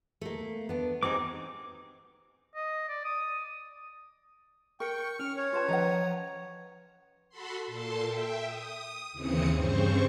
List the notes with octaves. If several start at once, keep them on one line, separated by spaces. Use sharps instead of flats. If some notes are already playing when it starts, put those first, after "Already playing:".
A3 A#3
B3 D4
C4 D#4 G4 G#4 D6
D#5
D5
D#6
A#4 G5 C#6 C#7
C#4 F6
C#5
F4 B4 A5
F3 B4 D#5 F#5 A#5
F#4 A4 B5 C6
A#2 A4 A5 C6
E5 G5
D#6
D#2 C#3 E3 C4 D#6 C#7
G2 C#3 C4 C5 C#6